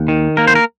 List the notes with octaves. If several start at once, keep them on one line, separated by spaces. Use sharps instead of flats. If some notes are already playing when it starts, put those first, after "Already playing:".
Already playing: D#2
D#3
A#3 A#4
C5
A#4